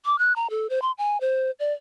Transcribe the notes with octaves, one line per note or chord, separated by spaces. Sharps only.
D6
F#6
A#5
A4
C5
C6
G#5
C5
D5